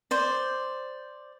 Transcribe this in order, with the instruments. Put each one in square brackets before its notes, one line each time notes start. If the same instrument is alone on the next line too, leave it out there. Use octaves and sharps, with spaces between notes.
[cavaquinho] C5 D5